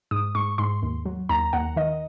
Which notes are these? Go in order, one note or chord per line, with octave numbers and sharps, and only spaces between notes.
G#2 D#6
G#2 C#6
G#2 C6
D#2
F#3
D#2 A#5
D#2 F#5
D#3 D#5